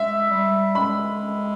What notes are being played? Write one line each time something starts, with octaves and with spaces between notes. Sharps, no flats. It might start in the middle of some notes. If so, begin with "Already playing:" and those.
Already playing: G#3 E5
G3
G#3 B5